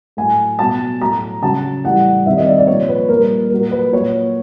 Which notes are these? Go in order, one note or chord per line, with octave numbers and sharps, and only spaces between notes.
A2 F#3 G#5
B2 F#3 A5
A2 F#3 A#5
C#3 F#3 A5
A2 E3 G3 F#5
C3 D#3 G3 E5
D#5
D5
D5
A#2 F3 C#5
B4
A#2 G3 A#4
A#2 F#3 A#4
B4
A#2 F#3 C#5